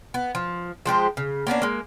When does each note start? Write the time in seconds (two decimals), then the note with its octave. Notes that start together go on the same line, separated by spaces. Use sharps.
0.14 B3
0.35 F3
0.86 F3 G#3 G4 C5
1.17 C#3
1.47 A#3 B3 C#4 D4
1.62 G#3 A#3